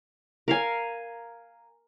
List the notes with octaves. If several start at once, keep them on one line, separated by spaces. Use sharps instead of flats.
A#4 F5 G#5